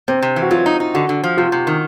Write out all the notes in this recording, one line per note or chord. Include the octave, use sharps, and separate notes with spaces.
C3 C4
C3
E3
F#4
F#3 F4
D#4
D#4
D3 F#4
D3
F3
C3 F4
C3
D#3